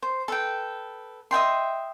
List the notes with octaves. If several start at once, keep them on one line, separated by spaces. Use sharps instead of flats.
C5
A4 B4 G5
D#5 E5 G5 C6